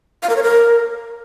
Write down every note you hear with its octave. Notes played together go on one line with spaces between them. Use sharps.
F5
A#4
C#5
A#4